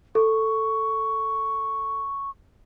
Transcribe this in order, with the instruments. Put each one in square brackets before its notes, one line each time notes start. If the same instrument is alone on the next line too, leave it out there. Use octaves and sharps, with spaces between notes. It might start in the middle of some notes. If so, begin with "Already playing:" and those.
[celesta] A4 [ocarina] C#6